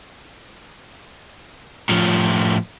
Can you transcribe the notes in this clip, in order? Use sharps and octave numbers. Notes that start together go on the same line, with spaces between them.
A2 F3